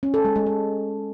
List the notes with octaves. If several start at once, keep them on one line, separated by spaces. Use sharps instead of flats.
C#4
A4
G#3
G#3
G#3